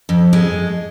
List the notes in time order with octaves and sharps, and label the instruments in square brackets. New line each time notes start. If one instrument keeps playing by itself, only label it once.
[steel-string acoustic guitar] F2
G#3